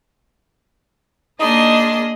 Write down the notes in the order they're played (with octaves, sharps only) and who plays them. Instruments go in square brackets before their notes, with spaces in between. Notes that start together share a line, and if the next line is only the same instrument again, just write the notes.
[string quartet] A#3 D4 C6 [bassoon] D#4 [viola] G#4 D#5